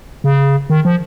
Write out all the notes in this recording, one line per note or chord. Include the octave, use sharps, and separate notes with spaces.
C#3
D#3
F3